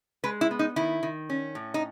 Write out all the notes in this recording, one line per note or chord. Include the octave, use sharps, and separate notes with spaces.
G#3 B4
E4
B3
D#4
D#3 E4
D#3
C#4
A2
D#4